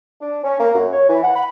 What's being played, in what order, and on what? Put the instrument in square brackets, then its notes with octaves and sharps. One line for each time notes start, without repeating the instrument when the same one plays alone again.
[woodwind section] D4
C#4
A#3
F#2
C#5
E3
F#5
B5